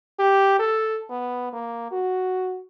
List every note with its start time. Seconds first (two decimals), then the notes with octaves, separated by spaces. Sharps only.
0.19 G4
0.59 A4
1.10 B3
1.53 A#3
1.91 F#4